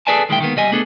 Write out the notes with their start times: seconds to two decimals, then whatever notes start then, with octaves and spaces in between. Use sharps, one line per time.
0.07 G#4 A4 B4 D5 G#5 A5
0.29 B1 D#3 G#3 A#3 E4 G5
0.40 D#3 G#3 A#3 B3
0.56 C2 G3 D#5 G#5
0.72 A3 B3 D4 G#4 A4